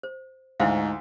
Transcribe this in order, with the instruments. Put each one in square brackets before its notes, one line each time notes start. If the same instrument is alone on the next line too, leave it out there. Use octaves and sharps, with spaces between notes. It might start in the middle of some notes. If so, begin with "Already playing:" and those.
[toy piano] C5
[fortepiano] D2 [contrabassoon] G#2 [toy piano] E4 C5 F5